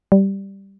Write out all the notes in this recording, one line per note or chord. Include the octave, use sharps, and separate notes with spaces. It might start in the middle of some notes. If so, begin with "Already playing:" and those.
G3